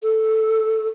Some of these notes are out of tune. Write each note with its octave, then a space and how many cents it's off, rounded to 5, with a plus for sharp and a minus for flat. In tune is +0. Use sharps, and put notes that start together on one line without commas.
A4 +0